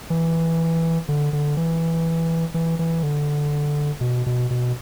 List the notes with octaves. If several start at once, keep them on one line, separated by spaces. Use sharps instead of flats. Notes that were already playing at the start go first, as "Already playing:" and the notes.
E3
D3
D3
E3
E3
E3
D3
B2
B2
B2